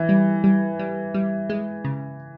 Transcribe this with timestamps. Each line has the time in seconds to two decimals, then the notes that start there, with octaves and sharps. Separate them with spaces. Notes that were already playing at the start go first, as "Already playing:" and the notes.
Already playing: E3
0.09 G3
0.44 G3
0.79 G3
1.14 G3
1.50 G#3
1.85 C#3